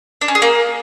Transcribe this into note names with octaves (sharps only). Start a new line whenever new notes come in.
D4
C#4
G#4
A#3